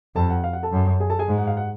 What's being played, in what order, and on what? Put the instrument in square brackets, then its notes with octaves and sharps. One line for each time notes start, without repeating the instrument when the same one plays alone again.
[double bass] F2 [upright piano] A4 A5
[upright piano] F#5
F5
F#5
A4 A5
[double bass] F#2
[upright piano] G#4 G#5
A4 A5
G#4 G#5
[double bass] G#2
[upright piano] F#5
F5
F#5